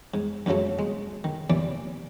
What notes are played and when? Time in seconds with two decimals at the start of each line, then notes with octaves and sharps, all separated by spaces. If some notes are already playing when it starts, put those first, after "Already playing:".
0.14 G#2
0.46 A#1 G#2 C#3 F#3 A3
0.79 G#3
1.24 D#3
1.50 D#2 E3 D5 D6